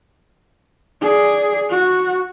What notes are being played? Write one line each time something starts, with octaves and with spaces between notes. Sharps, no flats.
G#4 D5
F#4